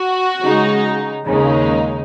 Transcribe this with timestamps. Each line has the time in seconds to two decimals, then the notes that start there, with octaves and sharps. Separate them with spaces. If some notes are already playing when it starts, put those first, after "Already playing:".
Already playing: F#4
0.39 C#3 G#3 D#4
1.26 D#2 C#3 G#3 D#4